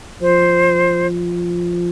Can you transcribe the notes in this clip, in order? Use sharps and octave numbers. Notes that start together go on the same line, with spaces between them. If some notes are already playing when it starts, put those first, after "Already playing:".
F3 C5